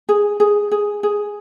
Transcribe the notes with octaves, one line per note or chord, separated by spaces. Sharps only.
G#4
G#4
G#4
G#4